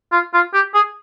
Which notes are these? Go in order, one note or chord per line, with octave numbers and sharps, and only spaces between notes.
F4
F4
G4
G#4